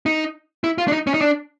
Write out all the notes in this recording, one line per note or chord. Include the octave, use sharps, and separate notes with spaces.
D#4
E4
F4
D4
D#4
C#4
D#4
D4